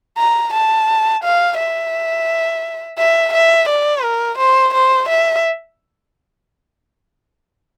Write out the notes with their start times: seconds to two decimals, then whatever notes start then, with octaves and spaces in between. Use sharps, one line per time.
0.18 A#5
0.54 A5
1.24 F5
1.59 E5
2.99 E5
3.33 E5
3.69 D5
4.03 A#4
4.39 C5
4.74 C5
5.09 E5